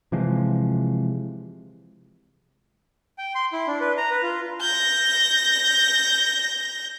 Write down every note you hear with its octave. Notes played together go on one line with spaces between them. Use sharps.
C3 E3 F3 G#3
G5
C6
E4
D4
B4
A#5
B4
F4
G6 A#6